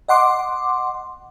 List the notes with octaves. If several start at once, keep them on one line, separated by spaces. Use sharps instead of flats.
D#5 F#5 C6 D6